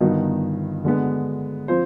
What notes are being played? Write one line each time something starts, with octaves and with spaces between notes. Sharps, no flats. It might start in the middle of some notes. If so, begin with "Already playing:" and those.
G1 G2 D#3 B3 D#4
D3 G#3 B3
F3 C4 F4 C5